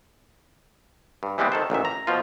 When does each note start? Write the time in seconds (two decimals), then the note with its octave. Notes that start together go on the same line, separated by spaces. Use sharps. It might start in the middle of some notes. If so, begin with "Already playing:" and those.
1.23 G2
1.38 E3 G3 G#3 B3 C4
1.52 D#3 A4 C5
1.70 A1 A#2 D#3 E5
1.85 A#5
2.07 B2 F3 F4